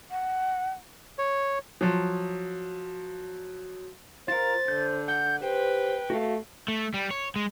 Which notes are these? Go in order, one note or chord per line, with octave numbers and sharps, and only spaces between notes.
F#5
C#5
F3 F#3
F4 A#4 C5 A6
D3 G6
F#5 G6
G4 B4 C5 G5
A3 F#4 F5
A3
G3
C#5
G#3